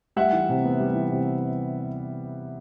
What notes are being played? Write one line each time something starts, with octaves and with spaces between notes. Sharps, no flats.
G3 E5 F#5
E3
C3
B3
G3
E3
C3